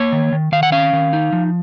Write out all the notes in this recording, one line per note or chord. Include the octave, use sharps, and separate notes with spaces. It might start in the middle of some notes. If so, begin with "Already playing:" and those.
Already playing: A#3 C#5
D#3
D#3
D#3 F5
F#5
C#4 F5
D#3
D#4
F3